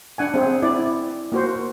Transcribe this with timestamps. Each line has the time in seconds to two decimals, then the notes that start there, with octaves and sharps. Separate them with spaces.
0.18 D4 F#5 G#5
0.34 C4 G#4
0.62 E4 D5
1.32 A#3 F#4 C5